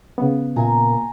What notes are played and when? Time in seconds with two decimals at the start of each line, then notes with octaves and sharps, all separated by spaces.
0.18 C#3 B3
0.56 A#2 G#5 A#5